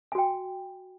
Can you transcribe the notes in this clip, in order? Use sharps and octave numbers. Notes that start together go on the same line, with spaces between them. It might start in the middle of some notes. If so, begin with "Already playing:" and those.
F#4 G5 G#5